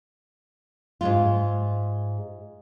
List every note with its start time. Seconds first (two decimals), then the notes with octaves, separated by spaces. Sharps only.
1.01 G#2 G#3 F4